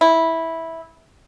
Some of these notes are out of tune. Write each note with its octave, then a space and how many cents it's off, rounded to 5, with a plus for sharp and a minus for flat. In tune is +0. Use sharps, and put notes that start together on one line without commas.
E4 -10